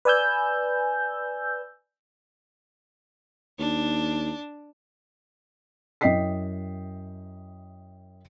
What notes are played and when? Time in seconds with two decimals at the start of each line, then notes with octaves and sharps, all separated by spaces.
0.05 B4 D5 G#5 E6 G6
3.59 D#2 D4
6.01 F#2 E4 D#5 G5 B6 C7